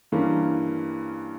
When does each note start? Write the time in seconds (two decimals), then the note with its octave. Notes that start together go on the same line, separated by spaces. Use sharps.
0.12 G2 E3 A#3 C#4